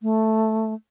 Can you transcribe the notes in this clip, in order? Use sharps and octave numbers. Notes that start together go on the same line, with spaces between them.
A3